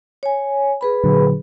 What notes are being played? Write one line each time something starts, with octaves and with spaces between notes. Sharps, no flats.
C#5 G#5
G#4 B4 B5
A#2 D3 F#3